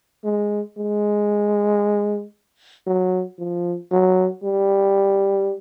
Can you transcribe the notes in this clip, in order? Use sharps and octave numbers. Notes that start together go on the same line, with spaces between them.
G#3
G#3
F#3
F3
F#3
G3